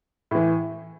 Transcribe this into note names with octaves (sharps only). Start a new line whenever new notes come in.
A2 E3